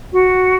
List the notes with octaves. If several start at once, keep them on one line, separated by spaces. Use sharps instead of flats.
F#4